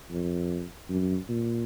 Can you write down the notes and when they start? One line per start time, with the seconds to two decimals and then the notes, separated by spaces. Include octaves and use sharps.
0.11 F2
0.89 F#2
1.29 A#2